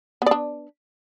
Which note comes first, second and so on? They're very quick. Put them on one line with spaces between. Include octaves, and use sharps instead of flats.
B3 D5 D4